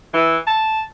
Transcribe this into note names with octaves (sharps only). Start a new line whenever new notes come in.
E3
A5